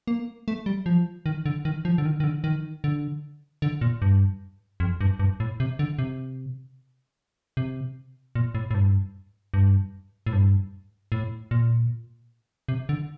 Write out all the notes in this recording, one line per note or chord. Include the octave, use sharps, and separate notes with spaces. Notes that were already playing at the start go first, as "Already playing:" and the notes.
A#3
A3
G3
F3
D#3
D3
D#3
F3
D3
D#3
D#3
D3
D#3
D3
D3
A#2
G2
F2
G2
G2
A2
C3
D3
C3
C3
A#2
A2
A2
G2
G2
A2
G2
A2
A#2
C3
D3